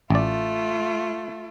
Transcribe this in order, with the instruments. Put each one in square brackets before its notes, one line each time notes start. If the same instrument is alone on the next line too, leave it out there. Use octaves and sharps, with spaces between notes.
[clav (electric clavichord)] A1 D5 [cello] A3 F4